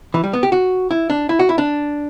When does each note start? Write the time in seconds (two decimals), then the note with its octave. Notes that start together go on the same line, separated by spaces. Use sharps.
0.14 E3
0.24 G3
0.33 B3
0.43 G4
0.52 F#4
0.91 E4
1.10 D4
1.29 E4
1.39 F#4
1.49 E4
1.58 D4